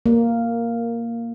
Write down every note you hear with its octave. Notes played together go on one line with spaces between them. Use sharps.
A#3